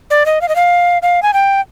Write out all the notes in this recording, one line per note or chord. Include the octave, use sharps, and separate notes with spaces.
D5
D#5
F5
D#5
F5
F5
G#5
G5